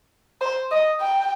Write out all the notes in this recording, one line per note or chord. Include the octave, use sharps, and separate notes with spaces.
C5
D#5
G5